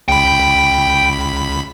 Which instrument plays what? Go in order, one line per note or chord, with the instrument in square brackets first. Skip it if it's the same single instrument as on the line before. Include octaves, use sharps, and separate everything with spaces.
[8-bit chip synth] C#2 B5 [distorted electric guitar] G5